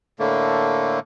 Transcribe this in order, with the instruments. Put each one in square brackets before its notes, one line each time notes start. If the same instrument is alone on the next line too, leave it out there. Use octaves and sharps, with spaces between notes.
[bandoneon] A2 D3 A3 A#3